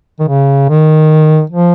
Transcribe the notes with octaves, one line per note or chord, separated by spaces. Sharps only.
D#3
C#3
D#3
F3